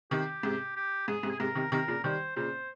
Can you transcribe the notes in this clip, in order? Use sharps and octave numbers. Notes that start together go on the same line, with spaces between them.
C3 D#3 G4
G#2 C3
G4
G#2 G#4
G#2 C3
G#4
G#2 C3 A#4
C3 D#3
C3 D#3 A#4
A#2 C#3
D#3 G3 C5
A#2 C#3 C5